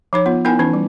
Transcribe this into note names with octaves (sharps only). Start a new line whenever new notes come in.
F3 D#4 C#5
B3 F4
B3 D#4 E4 A#4 G5 G#5
E3 C#4 D#4
G3